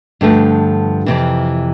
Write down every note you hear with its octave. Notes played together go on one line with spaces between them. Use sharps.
G2 D3 F3 A3
F2 C3 E3